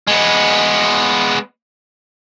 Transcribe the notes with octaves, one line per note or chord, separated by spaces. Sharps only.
G#3 B3